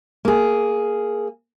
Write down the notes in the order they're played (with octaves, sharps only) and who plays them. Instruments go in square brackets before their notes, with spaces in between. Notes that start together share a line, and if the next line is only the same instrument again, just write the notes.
[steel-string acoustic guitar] A#3 G#4